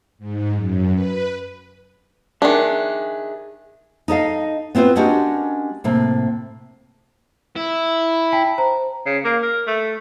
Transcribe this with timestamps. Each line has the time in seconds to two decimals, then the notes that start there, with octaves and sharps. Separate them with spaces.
0.19 G#2
0.54 F#2
0.93 B4
2.42 D#3 D4 G#4 E5
4.08 D#4 A4 D#5 F5
4.75 B3 C4 E4 F4 B4
4.96 G#3 C#4 D4 F#4 G4 A#4
5.84 A2 C3 A#3
7.56 E4
8.32 G5 A5 B6
8.58 C5 A#5
9.06 C#3
9.25 A#3
9.43 A#4
9.67 A3